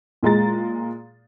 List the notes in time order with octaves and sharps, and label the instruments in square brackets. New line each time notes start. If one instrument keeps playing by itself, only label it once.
[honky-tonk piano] A#2 G#3 A#5 A6